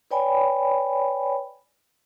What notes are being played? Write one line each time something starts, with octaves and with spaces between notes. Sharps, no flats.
B4 C#5 D5 G5 G#5 B5